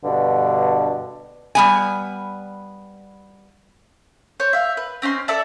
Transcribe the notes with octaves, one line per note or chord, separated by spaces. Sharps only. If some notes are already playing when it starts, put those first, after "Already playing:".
G2 B2 D3 D4
G3 B3 G#5
C5 C#5
E5 F5
B4
C4 C#4 D#4 C6
A4 D5 E5 A5